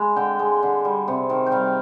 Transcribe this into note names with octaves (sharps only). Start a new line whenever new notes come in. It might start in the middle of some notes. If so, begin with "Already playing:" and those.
Already playing: G#3 B5
D3 G5
G#3
D3
G3
C3
D#3
G5
G3 F5